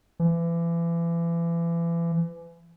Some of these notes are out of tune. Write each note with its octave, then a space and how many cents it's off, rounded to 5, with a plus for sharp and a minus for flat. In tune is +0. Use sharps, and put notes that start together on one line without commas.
E3 +35